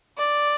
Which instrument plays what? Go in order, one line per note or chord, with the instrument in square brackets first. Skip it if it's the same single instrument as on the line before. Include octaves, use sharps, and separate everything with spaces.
[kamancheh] D5